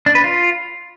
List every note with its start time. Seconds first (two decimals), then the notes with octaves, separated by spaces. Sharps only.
0.06 D4
0.15 B4
0.24 F4